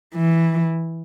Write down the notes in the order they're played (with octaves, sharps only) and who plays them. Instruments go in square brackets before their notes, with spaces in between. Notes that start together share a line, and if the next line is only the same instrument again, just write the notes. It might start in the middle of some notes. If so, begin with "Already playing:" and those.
[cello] E3